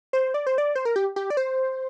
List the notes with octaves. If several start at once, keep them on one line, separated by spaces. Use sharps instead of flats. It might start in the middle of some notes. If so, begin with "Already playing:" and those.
C5
D5
C5
D5
C5
A#4
G4
G4
D5
C5